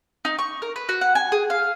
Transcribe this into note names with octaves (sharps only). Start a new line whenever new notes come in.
D#4
C#6
A#4
B4
F#4
F#5
G#5
G#4
F5